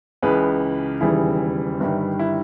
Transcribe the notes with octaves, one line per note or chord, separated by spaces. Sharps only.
C#2 C#3 E3 G#4 B4
E1 D#2 C#3 E3 G3 E4 G#4
G1 G2 D#3 G3
E4